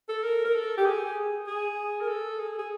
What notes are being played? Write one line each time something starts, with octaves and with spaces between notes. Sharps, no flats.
A4
A#4
A#4
A4
G4
G#4
G#4
A#4
A4
G#4
G#4